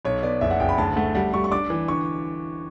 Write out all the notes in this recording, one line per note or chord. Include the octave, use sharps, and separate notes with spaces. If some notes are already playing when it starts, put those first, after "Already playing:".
B1 C#5
B3 D5
F#1 E5
F#5
F#1 G5
B5
D2 A5
A3 F#5
G3 F#5
G3 C#6
C#6
D4 D6
E3
D3 C#6